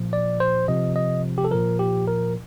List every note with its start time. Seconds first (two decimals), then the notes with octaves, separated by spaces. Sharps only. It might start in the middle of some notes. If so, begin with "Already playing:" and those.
Already playing: A#2 F3
0.13 D5
0.40 C5
0.68 C3 F3 D#5
0.96 D#5
1.38 G4
1.44 A4
1.51 A#2 F3 A#4
1.79 G4
2.08 A#4